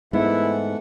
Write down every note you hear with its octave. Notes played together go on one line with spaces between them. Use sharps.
G#2 E3 A3 B3 E4 F#5